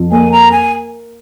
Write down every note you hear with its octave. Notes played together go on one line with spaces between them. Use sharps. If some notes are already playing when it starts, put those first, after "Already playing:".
Already playing: F2
A#3 G#5
A#5
G#5